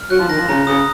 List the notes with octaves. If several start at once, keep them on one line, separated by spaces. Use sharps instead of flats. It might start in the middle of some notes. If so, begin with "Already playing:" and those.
Already playing: F6
F#3 F#6
F3
D#3 A#6
F3
C#3 A#5
C#3 D#6